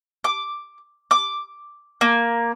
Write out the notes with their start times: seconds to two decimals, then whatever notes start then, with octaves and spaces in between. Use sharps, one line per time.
0.24 D6
1.11 D6
2.01 A#3